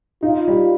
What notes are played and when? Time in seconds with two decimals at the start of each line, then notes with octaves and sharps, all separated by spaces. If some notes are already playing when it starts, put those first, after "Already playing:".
0.23 D#4 F4
0.48 G3